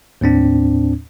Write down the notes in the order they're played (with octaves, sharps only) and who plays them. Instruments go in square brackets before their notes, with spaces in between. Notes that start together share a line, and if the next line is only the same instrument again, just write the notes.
[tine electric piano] D#2 A2 C4 D4